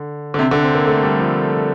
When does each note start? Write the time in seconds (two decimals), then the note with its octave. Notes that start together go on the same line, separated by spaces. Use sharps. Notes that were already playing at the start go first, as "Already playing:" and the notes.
Already playing: D3
0.34 D3
0.39 C3
0.51 D3
0.64 C4
0.75 A#3
0.87 A3
1.03 G3
1.19 F3